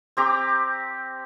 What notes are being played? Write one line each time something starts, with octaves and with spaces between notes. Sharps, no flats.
C4 G4 A#5 D6